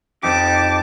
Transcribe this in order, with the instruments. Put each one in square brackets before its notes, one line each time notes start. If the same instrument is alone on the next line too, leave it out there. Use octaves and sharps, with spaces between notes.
[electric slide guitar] F2 D#4 G4 [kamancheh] A5 D6